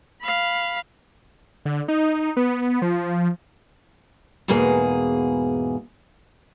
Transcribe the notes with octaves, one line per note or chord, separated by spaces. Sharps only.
F5 B5
D3
D#4
B3
F3
E2 G#2 B2 A#3 G#4